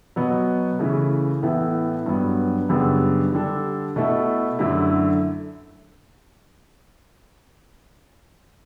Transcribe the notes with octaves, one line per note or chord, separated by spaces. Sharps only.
B2 F#3 B3
C#3 E3 A3
A2 E3 B3 E4 A4
G2 F#3 B3
F#2 C#3 G3 B3 D4
D3 G3 D4 A4
B2 A3 E4 A4
F#2 D3 A3 E4